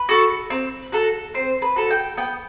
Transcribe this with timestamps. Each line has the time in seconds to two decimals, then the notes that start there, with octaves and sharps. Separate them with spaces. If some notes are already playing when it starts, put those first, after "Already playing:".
Already playing: B4
0.09 F#4 A4
0.50 C4
0.92 F#4 A4
1.34 C4 C5
1.62 B4
1.76 F#4 A4
1.90 G5
2.17 B3 G5